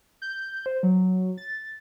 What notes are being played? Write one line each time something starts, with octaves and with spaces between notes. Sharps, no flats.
G6
C5
F#3
A6